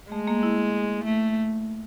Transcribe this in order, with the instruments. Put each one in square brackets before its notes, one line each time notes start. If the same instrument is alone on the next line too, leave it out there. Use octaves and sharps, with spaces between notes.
[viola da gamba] G#3 [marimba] A3
[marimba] A#3
E4
[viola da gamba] A3